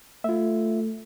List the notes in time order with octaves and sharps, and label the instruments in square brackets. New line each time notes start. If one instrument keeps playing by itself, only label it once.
[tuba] A3 [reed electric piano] F4 E5